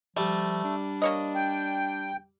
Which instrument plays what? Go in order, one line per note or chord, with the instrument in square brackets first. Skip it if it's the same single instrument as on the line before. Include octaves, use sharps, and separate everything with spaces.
[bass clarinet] F3 [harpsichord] G3 [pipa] A3
[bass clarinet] D4
[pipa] A#3 C#5 D#5
[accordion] G5